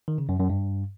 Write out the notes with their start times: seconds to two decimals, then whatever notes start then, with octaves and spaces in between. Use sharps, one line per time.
0.08 D#3
0.18 C#3
0.29 F#2
0.39 F#2
0.50 G2